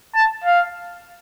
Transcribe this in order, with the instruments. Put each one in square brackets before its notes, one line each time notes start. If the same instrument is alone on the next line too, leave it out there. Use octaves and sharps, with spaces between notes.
[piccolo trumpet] A5
F5